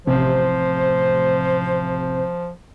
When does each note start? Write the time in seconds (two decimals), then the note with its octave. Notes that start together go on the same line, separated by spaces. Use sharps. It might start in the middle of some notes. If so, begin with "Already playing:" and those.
0.07 A1 C3 F3 C5